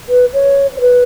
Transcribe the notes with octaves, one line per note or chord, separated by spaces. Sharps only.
B4
C#5
C#5
B4